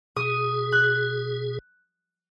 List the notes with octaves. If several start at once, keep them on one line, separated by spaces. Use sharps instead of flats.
B2 G#4 D#6
F#6